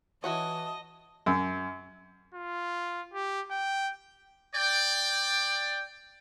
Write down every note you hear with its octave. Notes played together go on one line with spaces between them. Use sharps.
E3 E4 F#4 C#5 D#5 A5
F#2
F4
G4
G5
D5 G5